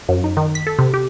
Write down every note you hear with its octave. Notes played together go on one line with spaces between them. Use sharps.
F#2
D#4
D#3
B6
A4
C3
G4